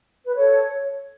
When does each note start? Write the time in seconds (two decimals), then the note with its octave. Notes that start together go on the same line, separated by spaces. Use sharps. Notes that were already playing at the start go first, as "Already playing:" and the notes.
0.26 B4
0.35 A4 C#5